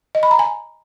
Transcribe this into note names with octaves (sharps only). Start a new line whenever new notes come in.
D#5
B5
A#5
G#5